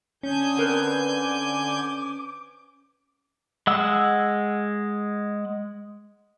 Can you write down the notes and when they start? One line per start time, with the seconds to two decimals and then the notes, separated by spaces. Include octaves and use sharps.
0.23 D3 C#4 G#5 A5 D#6 G6
0.57 C4 A#4 B4
1.14 D6
3.67 G#3 F#5 E6